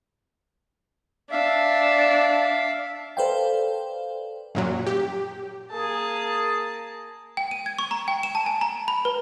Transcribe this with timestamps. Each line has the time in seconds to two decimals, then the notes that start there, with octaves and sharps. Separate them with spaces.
1.31 D4 E5 F5
3.17 A4 B4 C5 D5 F5 G5
4.55 F#2 A#2 F#3
4.87 G4
5.71 A#3 G#4 A5
7.37 G5
7.51 D#7
7.66 G#6
7.79 C#6
7.91 A#5
8.08 G5
8.23 E7
8.35 A5
8.46 G#5
8.61 A#5
8.88 B5
9.05 B4